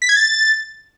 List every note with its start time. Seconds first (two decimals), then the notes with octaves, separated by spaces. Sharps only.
0.02 B6
0.09 G#6
0.16 A6